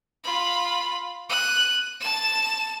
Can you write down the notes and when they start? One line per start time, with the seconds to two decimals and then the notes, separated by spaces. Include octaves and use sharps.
0.24 F4 B5
1.30 F#6 D#7
2.01 A5 E7